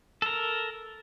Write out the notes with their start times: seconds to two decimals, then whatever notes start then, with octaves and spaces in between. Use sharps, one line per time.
0.22 A4 A#4